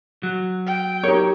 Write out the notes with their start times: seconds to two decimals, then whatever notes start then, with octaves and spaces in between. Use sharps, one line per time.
0.23 F#3
0.66 G5
1.03 D#4 G4 A#4 C#5